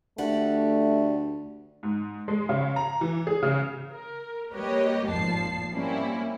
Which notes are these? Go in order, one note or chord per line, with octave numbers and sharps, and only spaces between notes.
D2 G3 A3 F#5
G#2
G#3
C#3
A#5
E3
G#4
C#3
A#4
G3 A#3 G4 B4 C#5 D#5
G#1 F2 A#2 F3 A5 C7
G3 A#3 C4 C#4 E4